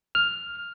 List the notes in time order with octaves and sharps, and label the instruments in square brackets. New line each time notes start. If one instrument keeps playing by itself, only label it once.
[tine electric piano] F6